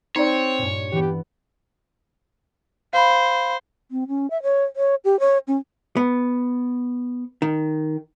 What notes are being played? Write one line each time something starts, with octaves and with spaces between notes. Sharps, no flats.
C4 D#4 C#5 D5 C6
G2 A#2
E3 B3 G4
C5 F5 B5
C4
C#4
E5
C#5
C#5
G4
C#5
C#4
B3
D#3